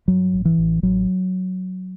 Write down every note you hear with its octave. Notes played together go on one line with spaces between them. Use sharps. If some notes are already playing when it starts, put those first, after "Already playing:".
G2 F#3
A1
E3
A1
A1 F#3